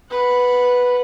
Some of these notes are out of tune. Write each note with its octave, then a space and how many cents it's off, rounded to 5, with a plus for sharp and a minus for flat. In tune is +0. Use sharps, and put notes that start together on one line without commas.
B4 +0 F#5 -10